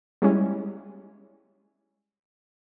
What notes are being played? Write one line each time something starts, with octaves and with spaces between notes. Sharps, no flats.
G3 G#3 C#4 E4